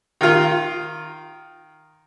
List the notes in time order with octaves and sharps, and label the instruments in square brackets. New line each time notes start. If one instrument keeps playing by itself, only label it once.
[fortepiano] D#3 F4